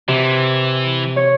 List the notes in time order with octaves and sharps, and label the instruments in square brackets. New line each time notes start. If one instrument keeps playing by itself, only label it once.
[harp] C3 [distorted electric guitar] E3
[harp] C#5